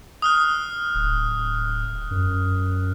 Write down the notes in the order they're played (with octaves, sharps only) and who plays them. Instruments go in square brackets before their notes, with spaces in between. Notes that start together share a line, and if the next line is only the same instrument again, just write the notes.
[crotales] D#6 F6 F#6
[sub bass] D1
F#2